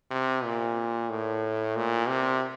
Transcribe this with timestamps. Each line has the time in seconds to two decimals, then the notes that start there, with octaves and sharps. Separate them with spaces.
0.11 C3
0.44 A#2
1.10 A2
1.76 A#2
2.09 C3